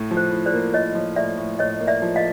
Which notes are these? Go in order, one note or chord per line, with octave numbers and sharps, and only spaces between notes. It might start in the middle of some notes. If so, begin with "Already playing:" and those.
Already playing: A2
F3
C5
A2
C5 D5
A#3
A#3 C#5 D#5
F3
A2 D5 E5
A2
A2 C#5 D#5
A#3
D5 E5
F3
D#5 F5